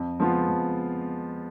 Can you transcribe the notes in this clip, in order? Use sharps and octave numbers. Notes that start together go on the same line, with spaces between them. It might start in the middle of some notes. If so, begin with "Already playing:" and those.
Already playing: F2
F3 G#3 B3 F4
F2